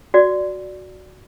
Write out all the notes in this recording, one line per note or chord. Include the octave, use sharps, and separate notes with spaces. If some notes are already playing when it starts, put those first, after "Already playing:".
F#4 D5